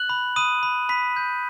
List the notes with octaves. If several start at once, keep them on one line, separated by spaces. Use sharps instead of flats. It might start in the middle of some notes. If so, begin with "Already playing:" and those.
Already playing: F#6 F#7
B5
B5 D#6 D#7
B5
B5 B6
G6